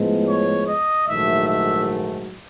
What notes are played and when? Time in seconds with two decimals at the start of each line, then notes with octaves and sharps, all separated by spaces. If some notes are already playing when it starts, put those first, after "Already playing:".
Already playing: A2 F3 G#3 B3
0.27 C#5
0.67 D#5
1.07 A#1 G#2 D#3 F#3 A3 E5
1.47 E5